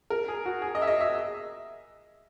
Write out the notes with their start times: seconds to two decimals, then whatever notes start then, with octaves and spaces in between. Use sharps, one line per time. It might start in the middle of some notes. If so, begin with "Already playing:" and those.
0.10 A#4
0.28 G#4
0.45 F#4
0.62 G#4
0.75 D#5
0.82 E5
0.87 D#5
1.01 E5